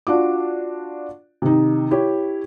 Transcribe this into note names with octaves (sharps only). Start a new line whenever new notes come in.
D4 F4 F#4 D6
C3 D#3 D#4
E4 G4 C#5